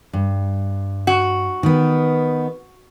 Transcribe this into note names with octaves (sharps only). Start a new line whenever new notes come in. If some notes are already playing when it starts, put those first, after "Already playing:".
G2
F#4
D#3 B3